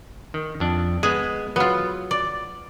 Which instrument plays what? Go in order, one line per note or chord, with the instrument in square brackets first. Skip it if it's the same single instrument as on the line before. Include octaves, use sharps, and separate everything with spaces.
[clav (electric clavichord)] D#3
F2 D4
[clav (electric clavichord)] G#3 B3 [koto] G#4
[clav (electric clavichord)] F#3 [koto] B3 F4
[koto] D5